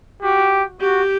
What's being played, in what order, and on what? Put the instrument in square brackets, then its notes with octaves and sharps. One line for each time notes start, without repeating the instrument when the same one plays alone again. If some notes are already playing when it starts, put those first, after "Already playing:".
[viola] F#4 [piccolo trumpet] G4
[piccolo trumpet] F#4 [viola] G4